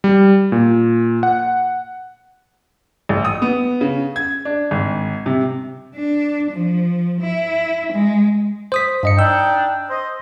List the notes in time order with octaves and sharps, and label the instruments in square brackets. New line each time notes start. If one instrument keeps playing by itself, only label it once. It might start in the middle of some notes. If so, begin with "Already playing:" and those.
[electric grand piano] G3
A#2
F#5
[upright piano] A1
D#6
B3
C#3
G#6
D4
G#1
C3
[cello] D4
F3
E4
G#3
[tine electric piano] C5 D#6 B6
G2 D#5 C#7
[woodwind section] D4 D#4 G5 [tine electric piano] E6
[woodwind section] C5 D#5